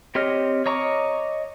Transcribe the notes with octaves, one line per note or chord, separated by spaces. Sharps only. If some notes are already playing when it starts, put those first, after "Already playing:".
C4 G4 C#5 D#5 F6
C#5 D#5 A#5 C#6 D6